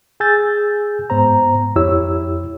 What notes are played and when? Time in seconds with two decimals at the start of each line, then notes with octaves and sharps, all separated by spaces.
0.20 G#4 G#5 E6 G6 A6
1.10 G#2 B3 C5 A#5
1.76 F2 E4 G4 C#5 E6